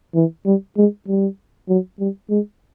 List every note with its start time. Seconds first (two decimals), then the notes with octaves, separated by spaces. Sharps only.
0.15 E3
0.46 G3
0.77 G#3
1.08 G3
1.69 F#3
1.99 G3
2.30 G#3